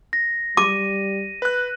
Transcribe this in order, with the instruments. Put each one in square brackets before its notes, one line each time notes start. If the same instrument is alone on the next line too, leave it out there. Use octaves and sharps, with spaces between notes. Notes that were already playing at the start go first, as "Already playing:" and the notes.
[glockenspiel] A#6
[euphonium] G3 [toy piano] D6 [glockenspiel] D#7
[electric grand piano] B4 F#6